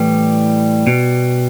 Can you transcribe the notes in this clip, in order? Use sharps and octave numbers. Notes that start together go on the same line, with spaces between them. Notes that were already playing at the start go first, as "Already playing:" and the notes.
Already playing: A2 E3 G3
B2